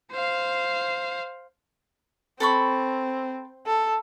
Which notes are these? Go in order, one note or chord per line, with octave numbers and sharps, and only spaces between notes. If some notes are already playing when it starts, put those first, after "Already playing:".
C5 F5
C4 A4 B5 C#6
A4